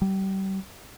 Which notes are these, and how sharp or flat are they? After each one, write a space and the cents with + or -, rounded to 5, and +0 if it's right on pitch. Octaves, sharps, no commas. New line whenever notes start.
G3 -30